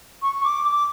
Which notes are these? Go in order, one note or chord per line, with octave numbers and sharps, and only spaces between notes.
C#6
D6
D6